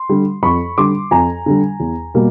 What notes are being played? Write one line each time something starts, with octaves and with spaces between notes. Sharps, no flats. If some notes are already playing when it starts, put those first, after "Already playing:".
Already playing: C6
D3 G3
F2 B5 C#6
D3 G3 C6 D6
F2 G#5 A#5
D3 G3
E2
B2 G3 A#3